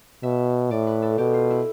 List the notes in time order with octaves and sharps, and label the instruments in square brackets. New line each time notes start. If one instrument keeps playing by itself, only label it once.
[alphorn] B2 [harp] E5
[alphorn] A2 [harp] D5
[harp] B4
A4
[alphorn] B2 [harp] G4
[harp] F4
E4